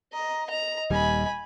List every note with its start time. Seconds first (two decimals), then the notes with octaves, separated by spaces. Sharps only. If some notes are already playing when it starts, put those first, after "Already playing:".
0.13 D#5 A#5
0.50 D#5 A#5
0.90 D#1 D#2 G3 G#5 B5